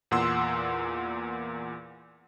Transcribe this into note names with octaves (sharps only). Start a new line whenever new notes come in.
E2 A#2 F#5 C6 E6